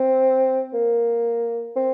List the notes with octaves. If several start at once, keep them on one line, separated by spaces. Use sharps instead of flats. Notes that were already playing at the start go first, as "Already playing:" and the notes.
Already playing: C4
A#3
C4